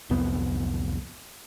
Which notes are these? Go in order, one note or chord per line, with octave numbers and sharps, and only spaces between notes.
D1 C2 F2 B3